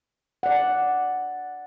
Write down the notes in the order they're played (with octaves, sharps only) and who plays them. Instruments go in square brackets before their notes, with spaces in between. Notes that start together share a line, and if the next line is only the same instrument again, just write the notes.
[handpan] D5 F#5